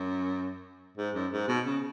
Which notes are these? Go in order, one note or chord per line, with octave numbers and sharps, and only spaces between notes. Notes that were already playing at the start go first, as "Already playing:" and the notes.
Already playing: F#2
G#2
F#2
G#2
B2
C#3